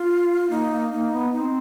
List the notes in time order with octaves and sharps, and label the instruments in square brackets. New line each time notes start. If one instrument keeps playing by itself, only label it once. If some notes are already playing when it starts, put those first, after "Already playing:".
Already playing: [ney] F4
[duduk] A#3 [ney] D#4
[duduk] A#3
[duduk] A#3 [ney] D#4
[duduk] B3
[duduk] C4 [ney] D#4